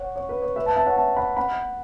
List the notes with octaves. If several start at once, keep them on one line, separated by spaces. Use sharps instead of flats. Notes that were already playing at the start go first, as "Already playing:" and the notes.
Already playing: C#5 F#5
C#5
B4
C#5
B4 E5
E5 A5
E5 A5
C#5 F#5
E5 A5
F#5 B5
F#5 B5